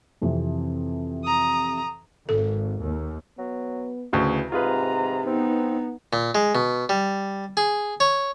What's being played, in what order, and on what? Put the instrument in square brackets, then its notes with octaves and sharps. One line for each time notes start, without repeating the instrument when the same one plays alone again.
[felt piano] F2 C3 E3
[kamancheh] A#5 D#6
[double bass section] G#1 [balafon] A4
[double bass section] D#2
[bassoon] F#3 [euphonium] B3
[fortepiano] D2 C#3 [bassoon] E3
[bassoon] G#2 [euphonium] C3 [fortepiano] F4 G#4 B4 [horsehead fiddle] A#5
[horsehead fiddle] B3 D#4 [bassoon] C4
[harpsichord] A#2
G#3
B2
G3
G#4
C#5